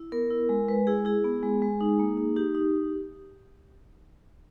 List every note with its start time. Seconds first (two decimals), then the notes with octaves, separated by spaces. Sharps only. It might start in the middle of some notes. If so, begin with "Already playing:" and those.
Already playing: E4
0.12 B3 A#4
0.30 E4
0.49 G#3
0.68 G#3 B4
0.87 E4 G#4
1.05 E4 G#4
1.24 B3
1.43 G#3
1.62 G#3
1.81 D#4
1.99 A#3
2.17 D#4
2.36 D#4 G4
2.55 D#4